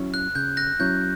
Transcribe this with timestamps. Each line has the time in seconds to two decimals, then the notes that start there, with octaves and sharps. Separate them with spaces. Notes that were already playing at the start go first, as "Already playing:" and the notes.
Already playing: F#3 C#4 E4
0.14 F#6
0.35 C#3 G6
0.57 F#6 A#6
0.79 F#3 C#4 E4 G6